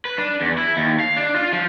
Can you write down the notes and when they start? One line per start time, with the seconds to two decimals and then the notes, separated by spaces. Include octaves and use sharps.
0.05 B4
0.18 D4
0.41 E2
0.58 E4
0.77 D#2
1.00 F5
1.17 D4
1.36 F4
1.53 F3